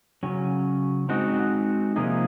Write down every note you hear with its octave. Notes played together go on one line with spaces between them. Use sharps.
C#3 F#3 C#4
G#3 C4 D#4 F#4
C3 F3 A#3 D#4 G#4